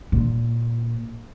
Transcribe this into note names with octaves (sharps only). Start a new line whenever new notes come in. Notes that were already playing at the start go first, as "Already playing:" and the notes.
A#2